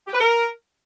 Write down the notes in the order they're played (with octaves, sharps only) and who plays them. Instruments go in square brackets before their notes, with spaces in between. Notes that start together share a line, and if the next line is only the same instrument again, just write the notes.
[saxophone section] G4
B4
A#4